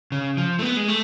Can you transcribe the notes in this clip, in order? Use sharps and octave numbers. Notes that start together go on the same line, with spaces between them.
C#3
F3
A3
B3
G#3
A3